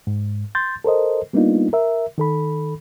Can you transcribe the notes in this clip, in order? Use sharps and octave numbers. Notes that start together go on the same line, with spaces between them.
G#2
C6 G6 A6
A4 A#4 C5 D#5
G3 A#3 B3 D4 D#4 F4
A#4 E5
D#3 A4 B5